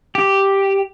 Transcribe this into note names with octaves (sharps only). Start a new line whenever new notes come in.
G4